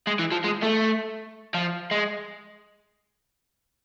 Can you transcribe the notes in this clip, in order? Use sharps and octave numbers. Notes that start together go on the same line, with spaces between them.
G#3
E3
F3
G#3
A3
F3
G#3